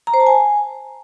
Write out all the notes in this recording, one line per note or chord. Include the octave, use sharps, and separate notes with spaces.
A#5
C5
A5
G#5